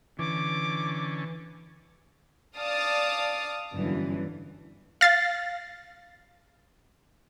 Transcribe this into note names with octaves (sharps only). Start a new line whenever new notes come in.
D3 E3 C#4 D6
D5 F5 A5 D6 D#6 F6
G1 F#2 D3 E3
F5 A6 C7